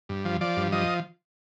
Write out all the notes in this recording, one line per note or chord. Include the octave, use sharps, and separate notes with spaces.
G2
F3
F3 D5
G2
F3 D#5